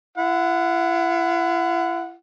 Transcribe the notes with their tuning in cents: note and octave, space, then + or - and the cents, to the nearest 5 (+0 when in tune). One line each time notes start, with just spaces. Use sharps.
E4 +40 F#5 -10